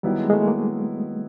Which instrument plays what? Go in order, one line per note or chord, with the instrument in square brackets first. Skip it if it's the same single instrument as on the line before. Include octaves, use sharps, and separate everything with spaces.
[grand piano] D#3 F#3 B3 E4 [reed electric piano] G3
[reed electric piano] G#3
G#3
A3
A#3